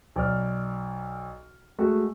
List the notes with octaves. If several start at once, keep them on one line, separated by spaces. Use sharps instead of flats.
B1 D5 F6
G#3 A3 F#4